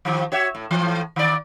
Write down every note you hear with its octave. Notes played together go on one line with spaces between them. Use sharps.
D#3 F3 G4
F#4 C#5 E5
A2
A2 E3
D#3 D5